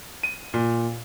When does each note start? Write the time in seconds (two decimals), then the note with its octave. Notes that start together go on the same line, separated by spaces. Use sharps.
0.23 D#7
0.54 A#2